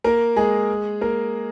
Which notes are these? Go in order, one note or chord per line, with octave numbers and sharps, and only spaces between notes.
A#3 A#4
G#3 G#4
A#3 A#4